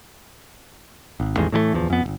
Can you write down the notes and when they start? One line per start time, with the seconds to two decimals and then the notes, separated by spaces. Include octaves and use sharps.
1.20 G#1
1.36 A1 E2 D#3 G#3
1.52 A2 E3 F3 A3
1.73 D1 E2 F3
1.90 F2 B3
2.03 D1 G1